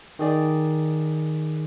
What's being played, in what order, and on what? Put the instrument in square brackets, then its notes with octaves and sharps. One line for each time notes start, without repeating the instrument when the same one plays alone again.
[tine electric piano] D#3 G#4 D5